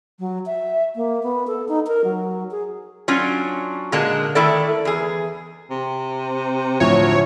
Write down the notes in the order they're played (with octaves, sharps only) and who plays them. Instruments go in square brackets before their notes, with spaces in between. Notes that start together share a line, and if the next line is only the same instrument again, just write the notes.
[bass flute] F#3
E5
A#3
B3
A4
D#4
A#4
F#3
G#4
[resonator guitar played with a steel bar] F#3 C#4 D4 F4
A#2 D3 G#3 A#3 D4 A5
D#3 A3 E4 A4 D5
E2 G#4
[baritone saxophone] C3
[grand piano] D2 A2 F3 [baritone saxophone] F#3 [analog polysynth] C#5